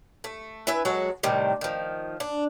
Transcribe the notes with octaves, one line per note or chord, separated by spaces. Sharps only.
A3
E4 B4 E5 G#5
F#3 G#3 F#4 A4
A2 C3 D#3 G3
D#3 F3
D4